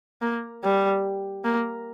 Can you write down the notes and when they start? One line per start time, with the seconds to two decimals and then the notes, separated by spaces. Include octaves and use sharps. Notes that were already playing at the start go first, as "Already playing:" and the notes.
0.22 A#3
0.64 G3
1.44 A#3